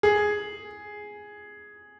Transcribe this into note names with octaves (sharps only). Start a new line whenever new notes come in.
G#4